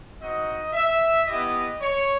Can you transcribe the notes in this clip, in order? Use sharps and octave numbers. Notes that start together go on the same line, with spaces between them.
C4 D#4 F#4 D#5
E5
B3 E4 G4 D#5
C#5